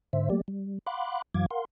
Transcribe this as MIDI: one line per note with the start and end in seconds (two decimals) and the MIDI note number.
0.13 0.29 44
0.13 0.29 50
0.13 0.29 72
0.13 0.29 76
0.30 0.41 54
0.30 0.41 57
0.30 0.41 58
0.30 0.41 67
0.30 0.41 74
0.48 0.79 55
0.87 1.22 77
0.87 1.22 78
0.87 1.22 83
0.87 1.22 84
0.87 1.22 86
0.87 1.22 90
1.34 1.46 42
1.34 1.46 52
1.34 1.46 54
1.34 1.46 77
1.34 1.46 86
1.34 1.46 92
1.51 1.65 70
1.51 1.65 77
1.51 1.65 78
1.51 1.65 84